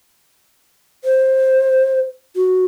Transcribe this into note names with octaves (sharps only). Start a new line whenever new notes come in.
C5
F#4